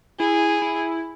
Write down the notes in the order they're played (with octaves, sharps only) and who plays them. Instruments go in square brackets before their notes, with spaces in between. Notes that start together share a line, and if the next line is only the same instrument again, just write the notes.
[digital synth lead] E4 [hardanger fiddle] G#4
[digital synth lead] E4